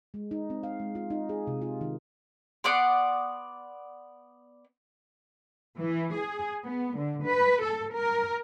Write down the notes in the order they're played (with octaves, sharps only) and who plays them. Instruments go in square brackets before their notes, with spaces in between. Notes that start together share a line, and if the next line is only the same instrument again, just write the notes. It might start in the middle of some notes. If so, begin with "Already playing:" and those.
[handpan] G#3
D#4
C4
F5
G#3
F4
D#4
G#4
C3
F4
D#3
[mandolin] B3 D5 F#5 C6
[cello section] E3
G#4
B3
D3
B4
A4
A#4